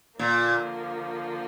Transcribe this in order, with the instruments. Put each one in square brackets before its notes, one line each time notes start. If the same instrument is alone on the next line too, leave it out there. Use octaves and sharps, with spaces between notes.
[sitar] A#2 [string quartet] D3 F3 A#3